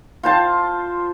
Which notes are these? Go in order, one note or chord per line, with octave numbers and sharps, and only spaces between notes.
F4 C5 A5